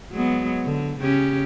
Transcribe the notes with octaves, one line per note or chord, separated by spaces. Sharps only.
F#3 G#3 B3
D3
C#3 C#4 G4